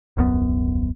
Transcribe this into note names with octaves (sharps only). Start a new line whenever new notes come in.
D#1 C2 F#2 B3